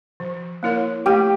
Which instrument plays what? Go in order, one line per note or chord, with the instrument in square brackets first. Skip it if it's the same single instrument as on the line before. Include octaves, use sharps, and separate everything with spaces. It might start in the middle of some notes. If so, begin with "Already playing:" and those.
[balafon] F3
A#3 E4 A#4 C#5
[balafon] A3 [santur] G4